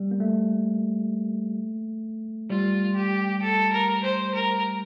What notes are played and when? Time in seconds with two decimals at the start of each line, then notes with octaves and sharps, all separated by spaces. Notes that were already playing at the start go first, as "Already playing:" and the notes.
Already playing: G3
0.11 A#3
0.20 A3
2.50 G3 F4
2.95 G4
3.42 A4
3.73 A#4
4.03 C5
4.34 A#4